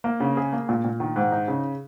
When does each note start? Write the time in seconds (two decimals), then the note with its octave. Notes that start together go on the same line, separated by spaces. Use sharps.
0.04 A#3
0.20 C#3
0.37 G#4
0.53 A#3
0.69 A#2
0.84 A#2
1.00 D#3
1.16 G#2
1.32 D#4
1.48 C#3